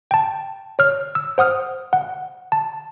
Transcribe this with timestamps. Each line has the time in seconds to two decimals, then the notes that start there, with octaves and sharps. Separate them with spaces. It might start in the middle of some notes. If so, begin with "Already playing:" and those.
0.11 G5 A5
0.79 C#5 F6
1.15 E6
1.38 C5 F#5 D#6 F6
1.93 F#5
2.52 A5